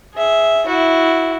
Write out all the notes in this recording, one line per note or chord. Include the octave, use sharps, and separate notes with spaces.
G#4 E5
E4 F#4